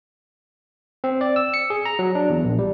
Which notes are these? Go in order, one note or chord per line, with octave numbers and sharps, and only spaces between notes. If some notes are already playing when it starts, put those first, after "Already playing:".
C4
D5
E6
C#7
G#4
A#5
F#3
D4
E2
A#1
G3